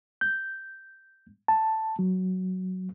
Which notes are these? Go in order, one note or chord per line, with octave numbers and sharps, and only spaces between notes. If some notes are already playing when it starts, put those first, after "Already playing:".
G6
A5
F#3